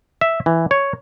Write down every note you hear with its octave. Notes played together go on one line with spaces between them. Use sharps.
E5
E3
C#5